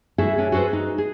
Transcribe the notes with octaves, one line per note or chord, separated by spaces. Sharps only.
E4 F#4 G#4 A4 E5
C#4 D4
F#4 G#4 A4 B4 C5
D#4
G#4